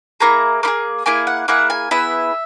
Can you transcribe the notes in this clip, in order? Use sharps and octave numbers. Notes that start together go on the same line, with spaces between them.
A#3 E4 G#4 A#5
A#3 E4 G#4
A#3 E4 G#4 G#5
F#5
A#3 E4 G#4 F#5
G#5
B3 E4 G#4 E5